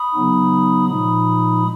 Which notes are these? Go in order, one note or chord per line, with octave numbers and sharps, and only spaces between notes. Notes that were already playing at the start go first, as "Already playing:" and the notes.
Already playing: B5 D#6
C#3 F#3 B3 D#4
A#2 F3 G#3 D#4 B5 D#6